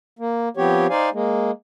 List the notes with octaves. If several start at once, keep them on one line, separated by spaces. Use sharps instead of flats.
A#3
F3 B3 C4 G4 C#5
D#4 C5 D5 F5 G#5
G#3 A#3